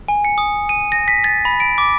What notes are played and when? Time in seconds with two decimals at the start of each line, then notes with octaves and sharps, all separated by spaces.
0.08 G#5
0.25 C#7
0.38 D#6
0.69 D#7
0.92 A#6
1.08 B6
1.24 A6
1.45 B5
1.60 D7
1.78 D6